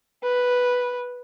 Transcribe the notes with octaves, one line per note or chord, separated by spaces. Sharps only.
B4